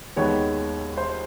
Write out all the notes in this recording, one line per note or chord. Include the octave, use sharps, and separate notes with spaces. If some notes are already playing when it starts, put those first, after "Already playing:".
D#2 D#3 G#3 B3 C#5
C5